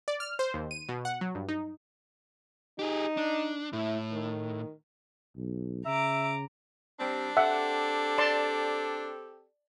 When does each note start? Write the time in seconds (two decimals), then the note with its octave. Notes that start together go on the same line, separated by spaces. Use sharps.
0.08 D5
0.20 F6
0.39 C5
0.54 D#2
0.71 D#7
0.89 B2
1.05 F#5
1.21 F#3
1.35 G2
1.48 D#4
2.79 D#4 G4 G#4
3.17 D4
3.73 A2 E4
4.11 D#3
5.36 B1
5.86 C#3 E5 A#5 D6
6.99 G3 C4 D4
7.37 C4 G4 A4 E5 F#5 E6
8.18 D5 A5 C6